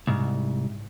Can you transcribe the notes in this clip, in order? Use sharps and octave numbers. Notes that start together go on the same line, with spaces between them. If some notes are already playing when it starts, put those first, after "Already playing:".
C2 G#2